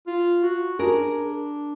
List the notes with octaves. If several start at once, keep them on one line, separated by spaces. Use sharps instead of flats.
F4
F#4
D4 G#4 A#4